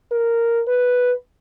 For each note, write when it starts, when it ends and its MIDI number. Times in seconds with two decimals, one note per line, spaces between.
0.12 0.62 70
0.68 1.12 71